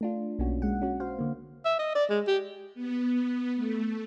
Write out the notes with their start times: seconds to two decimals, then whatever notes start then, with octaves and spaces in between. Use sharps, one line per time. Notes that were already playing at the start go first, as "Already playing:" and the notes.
0.01 A3 D4 F4
0.39 B1 A#3 C#4 F#4
0.62 G#3 F#5
0.82 C#4 F#4
1.00 F#4 C5 F5
1.19 D3 A#3
1.65 E5
1.79 D#5
1.95 D5
2.10 G#3
2.27 G4
2.75 B3
3.56 A3